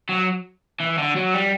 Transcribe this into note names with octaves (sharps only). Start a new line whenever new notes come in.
F#3
E3
D3
F#3
G3